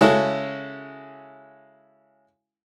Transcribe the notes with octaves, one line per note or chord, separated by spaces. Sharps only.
C#3 G#3 C#4 E4 F#4 A4